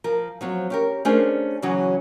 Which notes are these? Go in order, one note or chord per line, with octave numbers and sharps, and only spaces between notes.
F3 A#4
F3 F#3 C4
C#4 G4 A#4
A3 C#4 D4 G#4 A#4 C5
C#3 E3 F#3 C#4 F#4